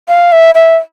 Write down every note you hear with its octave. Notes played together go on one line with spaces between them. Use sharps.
F5
E5
E5